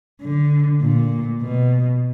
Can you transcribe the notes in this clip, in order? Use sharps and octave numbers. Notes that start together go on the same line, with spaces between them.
D3
A#2
B2